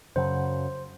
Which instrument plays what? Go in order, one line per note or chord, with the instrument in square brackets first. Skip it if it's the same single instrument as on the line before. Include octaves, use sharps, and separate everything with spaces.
[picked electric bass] F#2 C#3 F#3 [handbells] C5